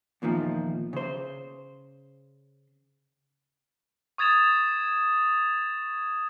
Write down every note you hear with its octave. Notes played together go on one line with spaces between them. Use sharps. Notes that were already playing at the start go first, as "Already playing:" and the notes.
E2 A#2 D#3 F3
C#3 C5
C#6 D#6 G#6 A6 E7 F7